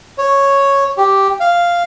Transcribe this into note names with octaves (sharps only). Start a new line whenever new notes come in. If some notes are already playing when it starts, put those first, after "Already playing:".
C#5
G4
F5